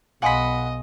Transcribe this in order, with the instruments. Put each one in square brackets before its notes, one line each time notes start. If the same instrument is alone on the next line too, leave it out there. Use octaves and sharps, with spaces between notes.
[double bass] B1 [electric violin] D#5 [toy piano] F5 G#5 C6 [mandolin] F#5 B5